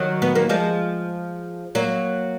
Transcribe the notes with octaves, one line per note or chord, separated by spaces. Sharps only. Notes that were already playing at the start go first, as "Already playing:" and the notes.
Already playing: D#3 F#3
B3
A#3
F3 G#3
F#3 A#3